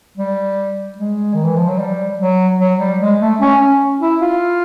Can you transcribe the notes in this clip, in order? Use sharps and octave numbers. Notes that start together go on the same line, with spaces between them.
G3
G#3
D#3
E3
F3
F#3
G3
F#3
F#3
G3
G#3
A3
C#4
C#4
E4
F4